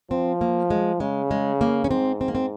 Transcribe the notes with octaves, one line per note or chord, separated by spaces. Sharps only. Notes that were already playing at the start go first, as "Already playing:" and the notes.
F3 C4
A#3
G#3
C#3 G#3
G#3
A#3
C#4
G#2 C4
C4
A#3
C4